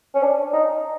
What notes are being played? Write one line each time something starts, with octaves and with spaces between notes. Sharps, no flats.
C#4
D4
D#4